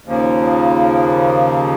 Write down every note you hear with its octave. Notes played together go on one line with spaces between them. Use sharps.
D#2 C#3 F3 A#3